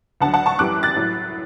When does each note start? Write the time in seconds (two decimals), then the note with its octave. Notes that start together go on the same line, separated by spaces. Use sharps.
0.21 D2 D3 F#3 F#5 A5
0.34 F#5 A5
0.46 A5 C#6
0.58 F#2 E3 G3 D6 F#6
0.83 F#6 A6
0.96 A2 F#3